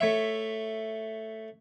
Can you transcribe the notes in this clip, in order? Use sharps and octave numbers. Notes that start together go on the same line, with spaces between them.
A3 C#5 E5